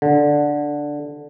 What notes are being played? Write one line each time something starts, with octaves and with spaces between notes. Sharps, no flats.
D3